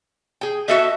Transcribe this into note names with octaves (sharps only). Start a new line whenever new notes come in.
G#4 G5
F#4 A4 D#5 E5